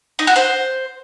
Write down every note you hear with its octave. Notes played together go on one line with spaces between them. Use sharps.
D#4
F#4
C5